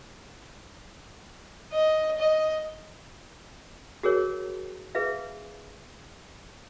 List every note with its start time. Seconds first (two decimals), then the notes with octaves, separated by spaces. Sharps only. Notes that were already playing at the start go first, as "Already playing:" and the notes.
1.72 D#5
2.18 D#5
4.03 F#4 G#4 A#4 C#5
4.95 G#4 B4 E5 F5